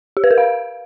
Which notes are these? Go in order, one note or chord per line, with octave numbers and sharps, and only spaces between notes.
G4
B4
A#4
F5